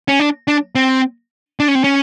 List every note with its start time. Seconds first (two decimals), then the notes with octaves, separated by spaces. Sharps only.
0.08 C#4
0.20 D4
0.48 D4
0.75 C4
1.60 D4
1.68 C#4
1.75 C4
1.84 C#4